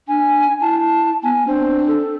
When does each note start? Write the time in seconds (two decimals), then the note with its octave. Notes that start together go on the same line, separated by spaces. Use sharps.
0.08 D4 G#5
0.61 E4 A5
1.23 B3 G#5
1.47 C4 D4
1.88 A4